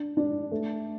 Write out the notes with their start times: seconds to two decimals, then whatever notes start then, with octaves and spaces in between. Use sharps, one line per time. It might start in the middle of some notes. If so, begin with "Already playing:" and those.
Already playing: D4
0.17 D4
0.52 A3